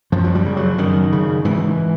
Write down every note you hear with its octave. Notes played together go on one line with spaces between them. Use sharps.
F#2 F3
F#3
G3
C#3
F#3
F#2 D#3
C#3
G#2 E3